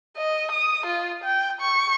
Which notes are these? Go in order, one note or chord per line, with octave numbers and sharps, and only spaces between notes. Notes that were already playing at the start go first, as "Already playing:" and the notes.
D#5
D#6
F4
G5
C#6